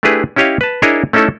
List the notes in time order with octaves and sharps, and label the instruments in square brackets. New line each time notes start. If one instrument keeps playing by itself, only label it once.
[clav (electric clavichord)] A3 D4 E4 G4 G#4 B4
C#4 E4 G4 C#5 D#5 F5
B4 A5
D4 E4 G#4 A#4 C#5 D#5
A3 C#4 D#4 E4 A4